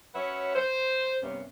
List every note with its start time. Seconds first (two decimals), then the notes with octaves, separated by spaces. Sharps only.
0.14 F#3 C#4 B4 C#5 E5 F#5
0.55 C5
1.22 G2 C3 A#3 B3 C#4